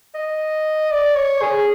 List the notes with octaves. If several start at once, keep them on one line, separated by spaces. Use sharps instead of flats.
D#5
D5
C#5
G#4